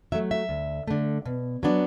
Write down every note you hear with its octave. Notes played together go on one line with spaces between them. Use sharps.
F#3 A3 E5
E5
D2
D3 A3
B2
F#3 B3 D4